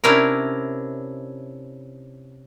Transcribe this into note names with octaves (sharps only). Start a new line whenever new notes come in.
C3 C#4 D4 E4 A#4